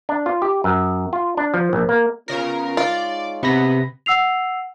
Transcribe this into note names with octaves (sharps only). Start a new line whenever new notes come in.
D4
F4
G4
F#2
F4
D4
F3
A#1
A#3
C#3 B3 C#4 F4 A#4
G#3 D#4 F4 C#5 D5
C3 B3 B5 A#6
F#5 E6 C7 F7